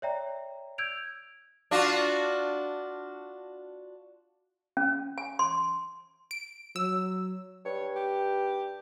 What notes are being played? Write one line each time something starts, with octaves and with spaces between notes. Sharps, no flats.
C#5 D5 E5 G5 A#5
E6 G6 G#6 D7 F7
D4 F4 F#4
C#4
G#5
C6
D7
F#3 E6
G2 C#5
G4